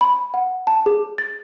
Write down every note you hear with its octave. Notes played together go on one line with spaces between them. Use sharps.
B5
F#5
A5
G#4
A6